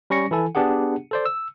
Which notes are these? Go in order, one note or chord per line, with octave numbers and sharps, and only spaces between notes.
G3 C#4 C#6 A#6 C#7
E3 E4 A4 G#5
B3 D4 G4 G#4 F#5
A4 C5 D5
E6